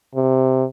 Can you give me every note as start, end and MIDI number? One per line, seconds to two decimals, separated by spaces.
0.15 0.64 48